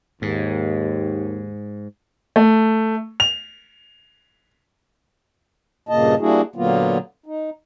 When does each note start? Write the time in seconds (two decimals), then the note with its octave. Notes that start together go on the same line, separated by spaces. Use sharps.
0.22 D#2 G#2
2.36 A3
3.20 F7
5.89 G2 A#2 C#3 A#3 D#5 A5
6.19 G3 A#3 D4 E4 F#4 G#4
6.56 A#2 D3 F#3 A#3 B3 F4
7.26 D#4